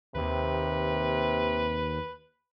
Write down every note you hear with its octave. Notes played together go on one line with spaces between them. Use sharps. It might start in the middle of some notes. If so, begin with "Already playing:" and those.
D#2 C3 B4